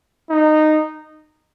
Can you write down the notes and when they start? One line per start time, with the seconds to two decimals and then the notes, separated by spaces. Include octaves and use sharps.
0.30 D#4